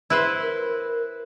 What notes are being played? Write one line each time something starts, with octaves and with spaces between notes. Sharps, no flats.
E4 B4 C5
A#4